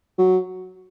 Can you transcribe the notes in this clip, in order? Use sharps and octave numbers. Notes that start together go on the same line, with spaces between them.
F#3